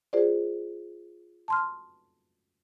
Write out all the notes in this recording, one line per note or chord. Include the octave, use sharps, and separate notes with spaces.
F4 G#4 C5 D5
A5 C6 F6